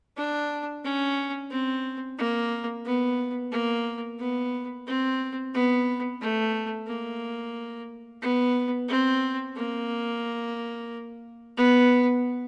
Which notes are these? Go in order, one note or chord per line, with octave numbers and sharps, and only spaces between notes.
D4
C#4
C4
A#3
B3
A#3
B3
C4
B3
A3
A#3
B3
C4
A#3
B3